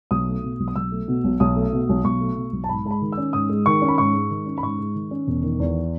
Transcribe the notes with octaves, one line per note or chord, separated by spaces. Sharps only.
B1 D#6
A3
B2
B1
D#6
B1 E6
A3
B2
B1
B1 D#6
A3
B2
B1
B1 C#6
A3
B2
B1
A5
G#2 B5
G#3 A5
B5
D#3
C#4 E6
G#2 D#6
G#3
D#3 C#6
C#4
B5
G#2 C#6
G#3
D#3
C#4
B5
G#2 C#6
G#3
D#3
C#4
E1
D#3
E2